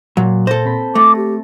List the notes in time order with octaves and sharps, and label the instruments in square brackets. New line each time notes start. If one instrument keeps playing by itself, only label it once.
[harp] A#2 [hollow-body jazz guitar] F#3
[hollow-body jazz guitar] A4 C5 [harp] A#6
[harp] C4 B5
[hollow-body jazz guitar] A3 [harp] A5 A#6 [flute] D6
[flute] G4